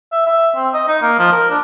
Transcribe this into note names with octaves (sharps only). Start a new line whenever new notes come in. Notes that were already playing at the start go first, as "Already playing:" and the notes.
E5
E5
C4
D#5
D#4
A#3
F3
A#4
D4